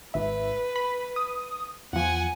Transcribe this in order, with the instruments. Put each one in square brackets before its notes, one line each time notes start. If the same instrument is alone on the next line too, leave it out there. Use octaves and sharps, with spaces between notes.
[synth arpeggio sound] G#1 E5 [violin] B4
[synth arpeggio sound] B5
D#6
[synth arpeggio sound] E2 F3 [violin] F#5 G#5